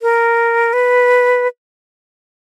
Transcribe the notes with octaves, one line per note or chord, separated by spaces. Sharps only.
A#4
B4